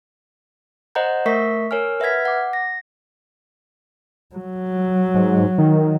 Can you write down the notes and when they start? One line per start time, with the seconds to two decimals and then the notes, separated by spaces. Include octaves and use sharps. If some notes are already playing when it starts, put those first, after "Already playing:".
0.95 C5 D#5 F#5 A#5 G6
1.26 A3 A#4 E5 C#6 B6
1.71 A#4 C#5 G#5 F6
2.00 B4 E5 F#5 F6 G#6 B6
2.25 F#5 D6
2.53 A#6
4.36 F#3
5.15 G#2
5.58 D#3